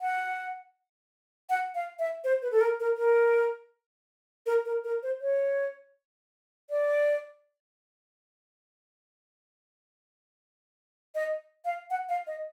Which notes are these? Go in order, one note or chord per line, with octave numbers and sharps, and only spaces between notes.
F#5
F#5
F5
E5
C5
B4
A4
A#4
A#4
A#4
A#4
A#4
A#4
C5
C#5
D5
D#5
F5
F#5
F5
D#5